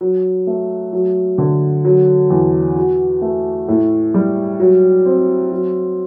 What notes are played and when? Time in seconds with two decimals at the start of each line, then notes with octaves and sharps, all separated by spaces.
0.01 F#3
0.47 A3
0.93 F#3
1.38 D3
1.85 F#3
2.30 E2
2.76 F#4
3.22 A3
3.68 A2
4.14 G3
4.60 F#3
5.06 C4
5.52 F#3